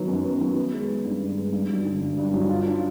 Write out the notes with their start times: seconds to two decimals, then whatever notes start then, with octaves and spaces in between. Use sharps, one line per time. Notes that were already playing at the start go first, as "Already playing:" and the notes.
Already playing: D#3 F#3 B3
0.08 F#2
0.25 B3
0.41 F#3
0.56 B3
0.73 G#3
0.89 D#3
1.05 G2
1.21 B3
1.37 G#3
1.53 G2
1.69 F#3
1.85 D3
2.01 G2
2.17 G2
2.34 F#3
2.49 F4
2.65 D4